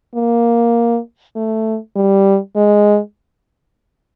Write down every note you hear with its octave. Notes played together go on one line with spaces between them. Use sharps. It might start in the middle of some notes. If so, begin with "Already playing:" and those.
A#3
A3
G3
G#3